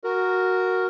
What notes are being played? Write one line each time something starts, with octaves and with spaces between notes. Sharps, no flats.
F#4 A#4